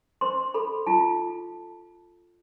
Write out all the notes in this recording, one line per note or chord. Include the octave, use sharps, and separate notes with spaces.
C5 C6
A4 B5
F4 A5